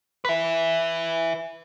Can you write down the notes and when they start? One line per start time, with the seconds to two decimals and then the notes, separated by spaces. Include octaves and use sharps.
0.25 B4 E5